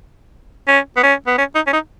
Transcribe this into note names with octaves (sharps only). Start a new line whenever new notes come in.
C#4
B3
C#4
B3
C#4
D#4
C#4
D#4